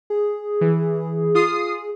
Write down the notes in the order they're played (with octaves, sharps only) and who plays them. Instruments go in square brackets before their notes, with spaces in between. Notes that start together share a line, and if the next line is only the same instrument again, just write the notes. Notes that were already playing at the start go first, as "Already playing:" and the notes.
[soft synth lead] G#4
[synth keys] E3
F4 D#6 C7